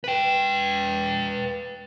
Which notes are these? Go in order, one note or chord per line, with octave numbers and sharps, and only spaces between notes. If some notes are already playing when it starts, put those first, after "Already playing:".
B4 G5